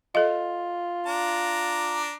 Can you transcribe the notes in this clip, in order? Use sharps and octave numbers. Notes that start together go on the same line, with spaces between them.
F4 A4 D#5
D4 A#5